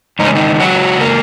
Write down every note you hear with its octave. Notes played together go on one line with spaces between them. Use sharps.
E2 C#3 G#3 D#4
C#4
D#3 D#4
F#3 F#4
A#3